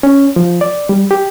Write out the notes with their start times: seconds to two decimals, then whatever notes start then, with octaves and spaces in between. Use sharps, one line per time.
0.03 C#4
0.36 F3
0.61 D5
0.89 G3
1.11 G4